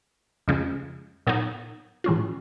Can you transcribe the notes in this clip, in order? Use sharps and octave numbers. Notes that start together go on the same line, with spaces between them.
F2 C#3 F3 G#3
A#2 F#3 B3 D#4
A2 E3 G#3 C#4 F4